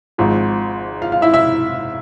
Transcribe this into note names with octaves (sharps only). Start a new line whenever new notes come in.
G#1 G#2 F3
F4 F5
F4 F5
E4 E5
E4 E5